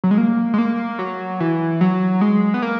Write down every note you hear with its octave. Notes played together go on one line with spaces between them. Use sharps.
F#3
G#3
A#3
G#3
A#3
F#3
E3
F#3
G#3
B3
A#3